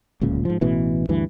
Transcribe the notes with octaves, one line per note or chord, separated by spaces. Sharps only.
D1 C#2 A#2 C#3
G#2 F3
A1 B2 E3
D2 G2 E3